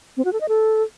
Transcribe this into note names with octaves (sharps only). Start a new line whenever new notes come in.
C4
F#4
A4
D#5
A4